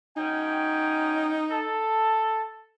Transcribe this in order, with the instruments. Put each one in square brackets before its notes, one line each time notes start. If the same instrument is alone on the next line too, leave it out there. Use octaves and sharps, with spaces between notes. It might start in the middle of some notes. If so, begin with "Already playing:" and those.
[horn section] F#2 C#4 G5 [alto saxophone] D#4
[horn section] A4 A5